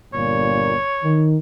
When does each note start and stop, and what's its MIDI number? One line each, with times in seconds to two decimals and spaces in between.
0.14 0.75 31
0.14 0.75 46
0.14 1.29 73
1.03 1.37 51